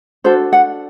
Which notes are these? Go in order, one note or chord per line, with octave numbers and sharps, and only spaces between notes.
D4 F#4 A4 C5
F#5